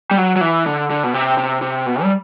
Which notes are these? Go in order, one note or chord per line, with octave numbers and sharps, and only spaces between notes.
G3
F#3
F#3
E3
D3
D3
B2
C3
C3
C3
B2
G3